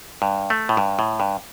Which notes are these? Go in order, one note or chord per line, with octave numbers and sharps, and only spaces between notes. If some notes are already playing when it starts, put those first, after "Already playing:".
G2
A3
A2
G2
A2
G2